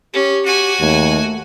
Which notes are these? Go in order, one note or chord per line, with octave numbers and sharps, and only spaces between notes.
C#4 G4
F#4 G#5
D#2 A3